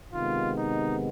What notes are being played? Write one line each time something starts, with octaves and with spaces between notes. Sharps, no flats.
C3 D#3 G#3 B3 F4
D#4